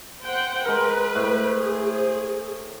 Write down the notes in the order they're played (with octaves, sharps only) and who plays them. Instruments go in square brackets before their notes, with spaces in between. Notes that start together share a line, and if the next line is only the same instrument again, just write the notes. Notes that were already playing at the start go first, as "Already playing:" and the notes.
[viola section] C5 F#5 G5
[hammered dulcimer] G#3 A#4 [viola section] B4
[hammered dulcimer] A2 [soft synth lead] C5
[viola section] G#4